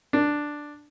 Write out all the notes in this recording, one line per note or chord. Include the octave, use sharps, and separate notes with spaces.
D4